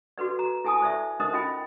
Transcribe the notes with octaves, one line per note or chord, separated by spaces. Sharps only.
F#4 A4 B4 D5
A#5
E4 A4 G#5 A5 D#6
A4 C5 D5 E5
D#4 A#4 C5 D#5 D#6
C#4 F4 D#5 G5 B5